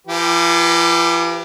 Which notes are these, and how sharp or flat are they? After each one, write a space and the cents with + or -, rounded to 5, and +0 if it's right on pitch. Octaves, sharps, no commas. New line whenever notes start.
F3 -45 G4 +0 B4 -20